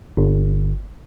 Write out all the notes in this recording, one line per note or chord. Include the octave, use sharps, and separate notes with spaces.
G1